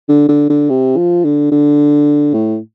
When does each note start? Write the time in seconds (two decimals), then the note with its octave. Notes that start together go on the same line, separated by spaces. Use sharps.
0.09 D3
0.29 D3
0.50 D3
0.70 C3
0.97 F3
1.24 D3
1.52 D3
2.34 A2